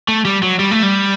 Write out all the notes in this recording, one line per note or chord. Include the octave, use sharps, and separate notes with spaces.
A3
G3
F#3
G3
A3
G3